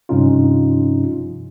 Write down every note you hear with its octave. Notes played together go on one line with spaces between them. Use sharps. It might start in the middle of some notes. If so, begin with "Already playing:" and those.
G2 C3 F3 C#4 D#4 F4